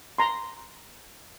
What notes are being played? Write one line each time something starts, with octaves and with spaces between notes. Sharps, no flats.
A#5 C6